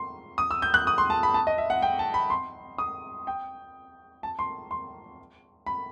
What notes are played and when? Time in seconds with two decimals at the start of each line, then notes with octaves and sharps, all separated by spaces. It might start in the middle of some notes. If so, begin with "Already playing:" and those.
Already playing: C6
0.38 D#6
0.51 E6
0.62 G6
0.74 F#6
0.87 D#6
0.98 C6
1.10 A5
1.23 B5
1.34 A5
1.47 D#5
1.58 E5
1.70 F#5
1.82 G5
1.99 A5
2.14 B5
2.30 C6
2.78 D#6
3.27 G5
4.23 A5
4.39 C6
4.71 C6
5.66 B5